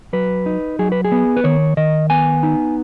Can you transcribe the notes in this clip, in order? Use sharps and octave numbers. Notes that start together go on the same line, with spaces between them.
F#3 B4
D#4
F#3 G#4
B4
G#4
B3
B4
D#3 C#5
D#3 D#5
B3 G#5
D#4